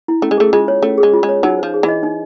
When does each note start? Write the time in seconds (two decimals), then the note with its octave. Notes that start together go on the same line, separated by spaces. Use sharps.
0.08 E4
0.22 A3 C#4
0.31 G#3
0.38 A3 G#4
0.53 G#3 F4
0.68 C#5
0.83 A3 C#4
0.98 G#4
1.03 G#3
1.13 F4
1.23 G#3
1.29 C#5
1.43 F#3 D#4
1.58 F3 C5
1.74 G#4
1.83 E3
1.88 D#5
2.03 D#4